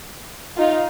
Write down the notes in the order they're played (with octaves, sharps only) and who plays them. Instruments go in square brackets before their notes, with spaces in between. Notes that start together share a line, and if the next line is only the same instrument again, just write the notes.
[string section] D#4 F4